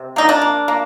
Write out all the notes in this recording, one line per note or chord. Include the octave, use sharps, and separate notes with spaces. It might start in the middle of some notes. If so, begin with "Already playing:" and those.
Already playing: C3
A#3 D#4
D4
A#3
A#3